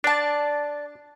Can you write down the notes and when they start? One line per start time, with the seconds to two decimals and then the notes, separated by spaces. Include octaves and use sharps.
0.04 D4 D5 A5